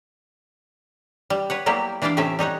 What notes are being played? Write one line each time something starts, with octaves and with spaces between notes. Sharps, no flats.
G3
B4 C#5 F#5
F#3 G3 A#3 B3 E4 G4
E3 D4 E4 D5 F5 G5
A2 C3 A3 C#4 E5
G3 D#4 C#5 F#5